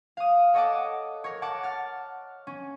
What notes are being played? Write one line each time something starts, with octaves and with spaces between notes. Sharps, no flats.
F5 D#6
A4 C#5 D#5 F#5 A5 D6
A#4 C#5
F#5 A5 D6
F6 A6
C#4